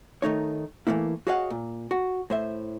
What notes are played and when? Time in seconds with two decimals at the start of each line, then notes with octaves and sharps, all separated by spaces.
0.22 D#3 A3 D#4 C#5
0.87 E3 F3 A3 A#3 E4
1.27 F#4 G#4 C#5 D#5 F5 F#5
1.50 A#2
1.91 F#4
2.30 A2 C5 E5